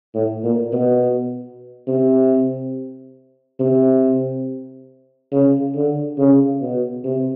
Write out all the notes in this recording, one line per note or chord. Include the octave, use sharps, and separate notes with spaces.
A2
A#2
B2
C3
C3
C#3
D3
C#3
B2
C3